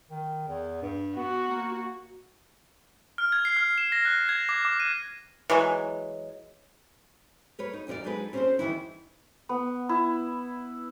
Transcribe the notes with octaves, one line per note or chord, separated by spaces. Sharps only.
D#3
E2
G2
B3 F#4
A#3
F6
G#6
C7
F6
E7
A#6
F#6
G#6
D6
D6
D#7
E3 F#3 G#3
A#4 B4 C#5
D#4
D2 B2 E4 A#4 D5
F#3 G#3 D#4 A4 B4
C4 C#4 E4 G#4 A4 C5
E2 A2 D#3 E3 B3 E4
B3
E4